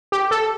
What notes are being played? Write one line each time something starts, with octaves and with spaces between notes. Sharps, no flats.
G4
A4